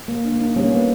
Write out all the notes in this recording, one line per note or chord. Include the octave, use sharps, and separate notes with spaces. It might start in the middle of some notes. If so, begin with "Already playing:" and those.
A#3
D4
A#3
D#4
G3 C#4
A#3
B3